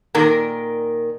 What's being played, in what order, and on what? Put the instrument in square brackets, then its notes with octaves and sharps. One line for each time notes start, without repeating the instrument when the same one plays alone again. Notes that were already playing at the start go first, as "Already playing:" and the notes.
[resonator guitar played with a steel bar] A#2 D#3 A#4